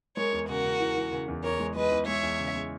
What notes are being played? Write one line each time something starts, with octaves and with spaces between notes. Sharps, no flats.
G#3 A#4 C#5
E2
C#3 F#4 A#4
C#3
E3
E3
C#3
E2
E2 A#4 C#5
G#3
G#3 B4 D#5
E2
G#3 C#5 E5
E2
C#3
G#3